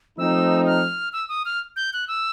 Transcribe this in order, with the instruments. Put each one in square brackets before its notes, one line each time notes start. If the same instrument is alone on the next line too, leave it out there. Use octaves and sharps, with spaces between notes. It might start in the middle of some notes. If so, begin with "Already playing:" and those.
[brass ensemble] F3 A3 C4 D#4 [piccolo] E6
[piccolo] F6
E6
D#6
F6
G6
F#6
E6